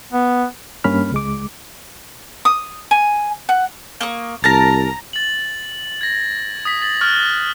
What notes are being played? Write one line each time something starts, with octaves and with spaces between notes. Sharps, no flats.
B3
G2 A#3 C#4 B5 F6
C#2 G#3 D6
D#6
G#5
F#5
A#3 C#6 D#6
C2 A#4 A5 A#5 A6 A#6
A6 F#7
G#6 A#6
D#6 B6
A6 F#7
C#6 F6 F#6 A6 A#6